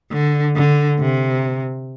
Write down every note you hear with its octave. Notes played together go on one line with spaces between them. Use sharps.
D3
D3
C3